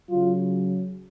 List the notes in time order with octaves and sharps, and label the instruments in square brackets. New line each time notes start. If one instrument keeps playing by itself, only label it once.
[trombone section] C#3 F#3 F4